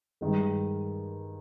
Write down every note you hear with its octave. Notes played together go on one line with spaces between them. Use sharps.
G2 D#3 G#3